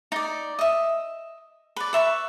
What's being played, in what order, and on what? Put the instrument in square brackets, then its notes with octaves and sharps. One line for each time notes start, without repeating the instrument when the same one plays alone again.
[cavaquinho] D#4 D5
D#5 E5
B4 D5
B4 E5 B5 C#6